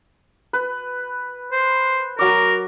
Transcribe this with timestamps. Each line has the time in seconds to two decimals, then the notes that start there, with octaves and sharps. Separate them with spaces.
0.53 B4
1.52 C5
2.19 F#3 A#4 D6